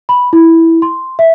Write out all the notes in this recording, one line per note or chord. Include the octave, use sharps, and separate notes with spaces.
B5
E4
C6
E5